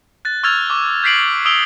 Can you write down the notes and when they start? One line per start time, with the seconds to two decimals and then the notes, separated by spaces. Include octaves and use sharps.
0.25 F#6 A6
0.43 C#6 E6 F6 G#6 A6 F7
0.70 C#6 D6
1.03 G6 A6 B6 C7 D7 F#7
1.45 D#6 E6 D7 F7 G7